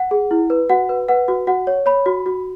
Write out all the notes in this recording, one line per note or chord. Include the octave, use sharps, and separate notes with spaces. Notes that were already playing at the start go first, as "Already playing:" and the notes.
Already playing: F#5
G#4
E4
B4
F#4 F#5
B4
B4 F#5
F#4
F#4 F#5
C#5
C#5 B5
F#4
F#4